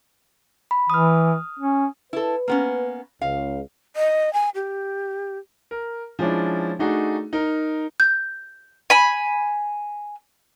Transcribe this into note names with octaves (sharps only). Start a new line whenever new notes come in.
B5
E3 D#6 F6
C#4
E4 A4 B4
A#3 B3 C#4
C#2 F5
D#5
G#5
G4
A#4
F3 G#3 C#4 D4 E4
A3 D4 D#4 F#4 G#4
D#4 A#4
G6
G#5 B5